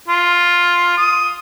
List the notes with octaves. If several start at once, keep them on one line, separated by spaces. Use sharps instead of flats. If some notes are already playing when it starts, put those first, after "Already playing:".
F4
D#6